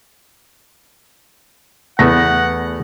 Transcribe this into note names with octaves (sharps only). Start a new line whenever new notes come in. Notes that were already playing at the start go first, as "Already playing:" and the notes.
E2 A3 B3 F#5 A#6